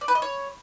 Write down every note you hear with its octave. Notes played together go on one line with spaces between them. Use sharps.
D5
B4
D#5
C#5